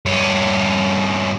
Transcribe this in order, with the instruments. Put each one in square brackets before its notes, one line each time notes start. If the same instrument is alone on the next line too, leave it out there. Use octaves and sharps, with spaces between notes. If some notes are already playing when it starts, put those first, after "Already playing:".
[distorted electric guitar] G2 C#4